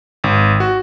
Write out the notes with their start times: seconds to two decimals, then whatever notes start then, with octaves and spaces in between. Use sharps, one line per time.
0.24 G#1
0.60 F#4